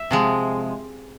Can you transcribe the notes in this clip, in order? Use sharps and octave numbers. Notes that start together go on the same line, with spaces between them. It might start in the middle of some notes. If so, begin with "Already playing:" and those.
Already playing: E5
C3 F3 G#3